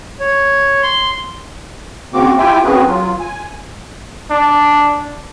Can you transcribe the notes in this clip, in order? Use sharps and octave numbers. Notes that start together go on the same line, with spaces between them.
C#5
C6
D#2 C#3 A#3 C4 F#4 D6
E4 F4 G4 E5 G5 G#5
A#3 C4 C#4 F#4 G#4 B4
F#3 F4
G#5
D4